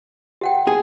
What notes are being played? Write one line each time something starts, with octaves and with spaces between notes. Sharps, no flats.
G4 F#5 G5
G#4